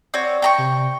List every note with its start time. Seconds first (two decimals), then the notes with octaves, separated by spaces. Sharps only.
0.14 C4 F#4 C#5 D5
0.42 G5 A#5 C#6
0.58 C3